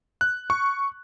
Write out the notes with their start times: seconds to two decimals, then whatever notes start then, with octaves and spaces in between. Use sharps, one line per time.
0.21 F#6
0.50 C#6